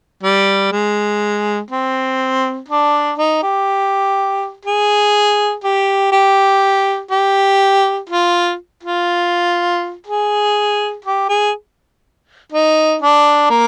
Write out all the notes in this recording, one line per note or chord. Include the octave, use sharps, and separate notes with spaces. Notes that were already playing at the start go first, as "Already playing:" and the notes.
G3
G#3
C4
D4
D#4
G4
G#4
G4
G4
G4
F4
F4
G#4
G4
G#4
D#4
D4
A#3